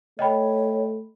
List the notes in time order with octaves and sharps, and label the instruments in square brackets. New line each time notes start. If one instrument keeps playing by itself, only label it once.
[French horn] A3 [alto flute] C#5 [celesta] D#5 G5 B5